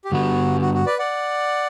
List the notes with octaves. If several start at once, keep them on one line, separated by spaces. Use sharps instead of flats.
G4
G2 D3 G3 B3 F#4
F#4
F#4
B4 D5
D5 F#5